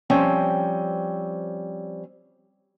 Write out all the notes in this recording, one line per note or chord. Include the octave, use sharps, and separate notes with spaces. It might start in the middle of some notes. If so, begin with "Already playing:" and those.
F3 G3 C4 C#4